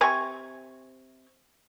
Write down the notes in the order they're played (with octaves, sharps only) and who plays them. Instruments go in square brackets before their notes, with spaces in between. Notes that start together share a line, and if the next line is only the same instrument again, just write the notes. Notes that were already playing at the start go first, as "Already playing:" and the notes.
[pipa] C3 G#5 C#6